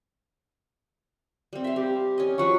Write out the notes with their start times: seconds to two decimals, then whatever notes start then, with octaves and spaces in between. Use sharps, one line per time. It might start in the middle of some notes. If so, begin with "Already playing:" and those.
1.53 G3 C4
1.64 E5 F5
1.76 C4 G4
2.18 C#4 D#5
2.38 F3 F#3 B4 C#6